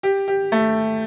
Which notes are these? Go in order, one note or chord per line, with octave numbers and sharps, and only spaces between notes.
G4
G4
A3